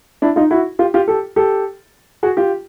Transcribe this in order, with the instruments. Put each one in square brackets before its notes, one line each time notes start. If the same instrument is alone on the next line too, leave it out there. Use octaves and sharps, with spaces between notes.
[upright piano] D4 E4
D#4 F4
E4 F#4
F4 G4
F4 G4
G4 A4
G4 A4
F#4 G#4
F4 G4